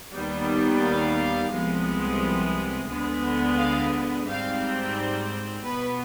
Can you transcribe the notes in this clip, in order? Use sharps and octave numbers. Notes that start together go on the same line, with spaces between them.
D#2 D#3 G3 B3
F5
C2 C3 F3 G#3 B3
D2 D3 G#3 B3
F5
G#2 G3 C4 F5
B2 B3 B4